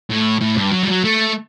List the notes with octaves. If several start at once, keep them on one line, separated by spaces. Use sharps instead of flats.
A2
A2
G2
F#3
G3
F#3
A3